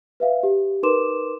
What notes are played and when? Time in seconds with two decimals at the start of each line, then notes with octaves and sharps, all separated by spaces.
0.20 B4 E5 F5
0.43 G4
0.83 D#4 A#4 B4 C6 D6 E7